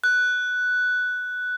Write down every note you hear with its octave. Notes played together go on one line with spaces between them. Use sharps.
F#6